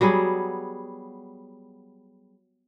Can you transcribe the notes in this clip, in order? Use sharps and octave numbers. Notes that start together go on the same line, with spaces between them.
F#3 G3 B3 G#4